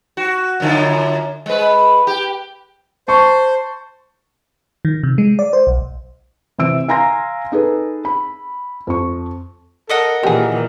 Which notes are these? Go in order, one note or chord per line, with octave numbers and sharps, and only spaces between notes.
F#4
F#2 D3 F4
G#3 B4
G4
C5 A5 C#6
D#3
C3
G#3
D5
C5
B1
C3 E3 E6 D7
F5 G#5 A#5 C6 A#6
D#4 G#4 A4 B4
B5
F2 C#6
A4 A#4 D#5 F#5
A#2 D#3 E3 G4 G#4